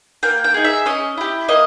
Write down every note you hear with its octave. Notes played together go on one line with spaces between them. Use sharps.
A#3 G5
G5
D#4 G#4
E5
C#4 D#5
E4 G4
A#3 D#5